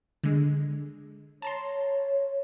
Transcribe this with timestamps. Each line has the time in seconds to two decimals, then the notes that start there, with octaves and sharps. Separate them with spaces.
0.24 D3 G#3
1.42 C#5 A5 A#5 C6